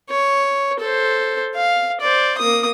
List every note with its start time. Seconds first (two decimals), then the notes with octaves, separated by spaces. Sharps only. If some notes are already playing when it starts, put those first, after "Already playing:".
0.10 C#5
0.80 A4 C5
1.55 F5
2.01 C5 D5
2.38 A#3 D#6